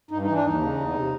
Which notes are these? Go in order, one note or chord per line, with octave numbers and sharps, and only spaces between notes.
G2 D#4
D#4
E3
D4
D#2 D#4
C#3
E2
C3